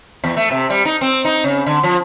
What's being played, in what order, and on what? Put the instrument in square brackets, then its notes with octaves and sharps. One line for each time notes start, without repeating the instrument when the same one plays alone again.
[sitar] E2
A3
C3
G3
D#4
C4
D#4
C#3
D3
F3